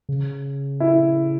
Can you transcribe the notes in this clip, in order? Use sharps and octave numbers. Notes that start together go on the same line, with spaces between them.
C#3
E4